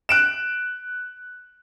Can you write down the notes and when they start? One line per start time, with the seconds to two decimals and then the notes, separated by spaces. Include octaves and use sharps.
0.09 F#6 D7 E7